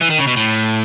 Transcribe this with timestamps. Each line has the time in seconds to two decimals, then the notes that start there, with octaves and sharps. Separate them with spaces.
0.01 E3
0.10 D#3
0.19 C#3
0.27 B2
0.37 A2